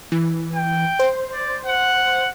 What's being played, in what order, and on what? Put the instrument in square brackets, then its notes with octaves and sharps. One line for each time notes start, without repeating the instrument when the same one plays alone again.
[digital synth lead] E3
[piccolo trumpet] G5
[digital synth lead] C5
[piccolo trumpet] D5
F#5